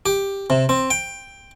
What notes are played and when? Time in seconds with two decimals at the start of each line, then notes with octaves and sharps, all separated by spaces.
0.06 G4
0.50 C3
0.69 C4
0.90 G5